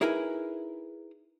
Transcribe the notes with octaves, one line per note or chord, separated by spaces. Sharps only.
D#4 E4 G#4 A#4 B4 G#5